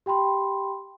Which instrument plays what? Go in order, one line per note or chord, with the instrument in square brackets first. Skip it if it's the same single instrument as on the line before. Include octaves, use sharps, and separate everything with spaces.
[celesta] G4 G5 B5 C6